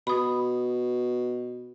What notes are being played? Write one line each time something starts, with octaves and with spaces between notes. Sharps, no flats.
B2 B5 D#6